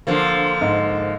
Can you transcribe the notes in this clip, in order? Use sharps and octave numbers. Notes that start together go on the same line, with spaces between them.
D3 F3 A#3
G#2